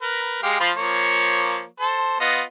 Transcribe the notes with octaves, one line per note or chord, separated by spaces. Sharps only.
A#4 B4
G#3 G4 F5
F3 F4 B5
F3 A#3 C#5
A4 C5
B3 F4 D#5